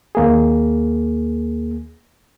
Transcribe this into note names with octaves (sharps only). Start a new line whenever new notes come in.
D#2 A#3 G#4